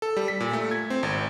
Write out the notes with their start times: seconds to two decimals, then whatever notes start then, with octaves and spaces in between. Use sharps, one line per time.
0.02 A4
0.16 G3
0.28 B6
0.40 A#2
0.53 A3
0.71 G#6
0.90 C4
1.03 G#1